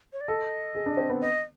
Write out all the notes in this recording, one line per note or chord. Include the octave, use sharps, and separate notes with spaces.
C#5
D5
A4 D#5
G#4
D4
C4
B3
D#5